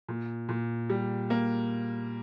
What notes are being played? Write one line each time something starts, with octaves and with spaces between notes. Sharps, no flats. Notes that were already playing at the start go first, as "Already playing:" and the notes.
A#2
A#2
G3
A#3